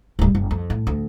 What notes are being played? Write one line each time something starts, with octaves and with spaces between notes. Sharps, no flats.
D1 G3
F#1
F2
A2
D2